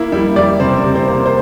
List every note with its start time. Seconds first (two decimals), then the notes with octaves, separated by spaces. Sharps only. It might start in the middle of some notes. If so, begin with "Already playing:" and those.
Already playing: A#3 E4
0.12 G3 E4
0.36 G3 D5
0.60 C3 C5
0.84 C3
0.96 C5
1.08 A#3
1.26 C5